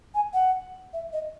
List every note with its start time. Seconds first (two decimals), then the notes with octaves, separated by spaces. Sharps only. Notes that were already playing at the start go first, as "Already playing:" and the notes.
0.15 G#5
0.33 F#5
0.93 E5
1.13 D#5